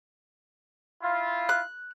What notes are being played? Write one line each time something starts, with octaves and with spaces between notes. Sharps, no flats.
E4 F4
F#6